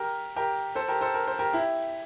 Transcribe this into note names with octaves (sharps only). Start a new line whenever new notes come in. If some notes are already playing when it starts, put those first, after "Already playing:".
Already playing: G4 A#4
G4 A#4
A4 C5
G4 A#4
A4 C5
A#4
C5
G4 A#4
E4 G4